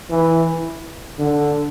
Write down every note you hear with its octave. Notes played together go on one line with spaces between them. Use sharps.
E3
D3